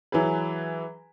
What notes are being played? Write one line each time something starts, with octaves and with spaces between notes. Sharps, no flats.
E3 F#3 G#4 B4